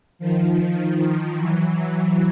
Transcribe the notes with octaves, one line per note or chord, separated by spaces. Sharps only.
D#3 F3
E3 F#3